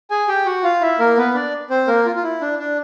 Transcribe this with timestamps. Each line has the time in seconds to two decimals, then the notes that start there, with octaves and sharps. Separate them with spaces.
0.10 G#4 G#5
0.28 G4 G5
0.46 F#4 F#5
0.63 F4 F5
0.81 E4 E5
0.99 A#3 A#4
1.17 B3 B4
1.35 D4 D5
1.70 C4 C5
1.87 A#3 A#4
2.05 F4
2.16 F4
2.23 E4
2.41 D4
2.59 D4